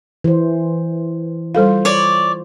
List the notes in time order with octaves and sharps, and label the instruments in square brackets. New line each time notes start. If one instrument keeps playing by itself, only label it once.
[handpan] E3 C5
[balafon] G3 A4 F5 [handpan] F4 C5
[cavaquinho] C#5 D5